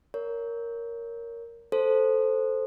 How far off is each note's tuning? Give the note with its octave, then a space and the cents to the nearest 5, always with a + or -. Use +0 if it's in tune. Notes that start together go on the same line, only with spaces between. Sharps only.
A#4 +0 C#5 +25
A4 +0 C5 +0